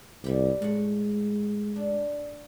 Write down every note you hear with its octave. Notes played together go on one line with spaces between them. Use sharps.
C2 G3 E4 G4
A2 G#3 F#5
D4